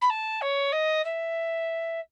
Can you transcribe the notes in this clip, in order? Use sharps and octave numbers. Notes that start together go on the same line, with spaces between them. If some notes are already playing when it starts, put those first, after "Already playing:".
B5
A5
C#5
D#5
E5